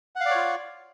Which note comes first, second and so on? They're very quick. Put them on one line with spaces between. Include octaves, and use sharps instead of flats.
F#5 F5 D5 C#5 F4